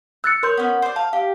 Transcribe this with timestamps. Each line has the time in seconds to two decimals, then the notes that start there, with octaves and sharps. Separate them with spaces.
0.24 E6 F#6 A6 C#7
0.43 A#4 C#5 C6 G6
0.57 B3 C#4
0.82 C5 D5
0.96 F5 A5
1.13 G4 F5